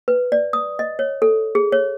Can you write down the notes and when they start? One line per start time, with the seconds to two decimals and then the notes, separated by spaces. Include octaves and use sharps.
0.08 B4
0.32 D5
0.53 D#6
0.79 D#5
0.99 C#5
1.22 A4
1.55 G#4
1.72 C#5